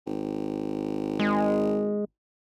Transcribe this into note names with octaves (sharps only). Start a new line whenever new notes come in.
G#1
G#3